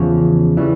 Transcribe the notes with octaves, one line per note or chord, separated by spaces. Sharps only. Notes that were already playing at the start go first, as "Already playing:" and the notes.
Already playing: E2 C#3 F3
C#3 E3 G3